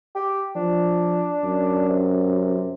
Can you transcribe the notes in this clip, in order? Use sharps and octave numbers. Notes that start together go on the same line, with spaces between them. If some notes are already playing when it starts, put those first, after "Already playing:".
G4
F3 D4
F#2
C3